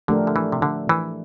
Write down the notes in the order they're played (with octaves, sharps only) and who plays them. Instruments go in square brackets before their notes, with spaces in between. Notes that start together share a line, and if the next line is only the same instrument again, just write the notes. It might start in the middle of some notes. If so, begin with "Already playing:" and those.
[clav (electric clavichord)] D3 [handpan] F3 A3 D4 G4 A#4
[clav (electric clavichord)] D3
E3
C3
D3
E3